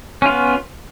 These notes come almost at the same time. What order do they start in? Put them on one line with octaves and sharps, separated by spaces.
C#4 F4 B3